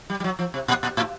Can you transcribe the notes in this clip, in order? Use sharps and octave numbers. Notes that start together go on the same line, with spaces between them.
G3
G3
F#3
F3
C3
A#2
A#2
A2